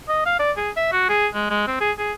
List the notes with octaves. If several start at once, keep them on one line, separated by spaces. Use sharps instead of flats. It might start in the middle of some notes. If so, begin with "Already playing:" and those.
D#5
F5
D5
G#4
E5
F#4
G#4
G#3
G#3
C4
G#4
G#4